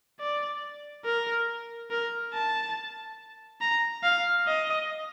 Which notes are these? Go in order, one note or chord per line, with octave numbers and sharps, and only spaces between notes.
D5
A#4
A#4
A5
A#5
F5
D#5